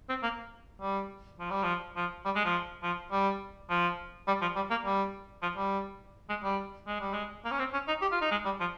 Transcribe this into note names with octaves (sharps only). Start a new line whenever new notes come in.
C4
A#3
G3
F3
G3
F3
F3
G3
G#3
F3
F3
G3
F3
G3
F3
G3
A#3
G3
F3
G3
G#3
G3
G#3
G3
G#3
A#3
C#4
C4
C#4
D#4
G4
F4
D#4
G#3
G3
F3